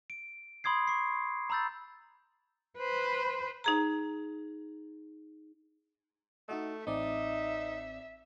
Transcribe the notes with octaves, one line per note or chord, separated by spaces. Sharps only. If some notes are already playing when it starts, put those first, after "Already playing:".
D7
B5 C6 D#6 G#6 C7
C#6 C7
A#5 B5 E6 G6 A6
B4 C5
D#4 G#4 A#5
A3 D#4 F#4 D#5
A1 C4 D#4 D5 E5